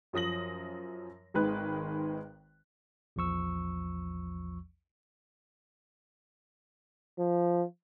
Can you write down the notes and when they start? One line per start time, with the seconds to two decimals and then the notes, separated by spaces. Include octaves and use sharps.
0.13 F#2 F3 D#6 A#6 F#7
1.34 G#1 D#3 G#3 B4 F#6
3.16 A#1 E2 F3 C#6 E6
7.19 F3